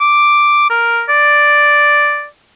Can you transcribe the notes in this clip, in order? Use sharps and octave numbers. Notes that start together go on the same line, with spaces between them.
D6
A#4
D5